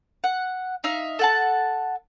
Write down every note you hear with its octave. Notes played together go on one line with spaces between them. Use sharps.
F#5
D#4 E5 F5
A4 F#5 A5